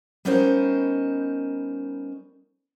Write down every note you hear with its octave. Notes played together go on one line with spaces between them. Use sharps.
G3 B3 C#4 D#4 A#4 C5